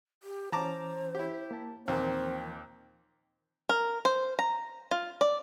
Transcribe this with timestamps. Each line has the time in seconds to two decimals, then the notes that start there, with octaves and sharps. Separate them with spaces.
0.23 G4
0.52 E3 C#4 C5 A5 A#5 D6
1.15 E4 G4
1.51 A#3 A5
1.88 D#2 A#2 E3 F3 C4 A#4 G5
3.69 A#4
4.05 C5
4.39 A#5
4.91 F4
5.21 D5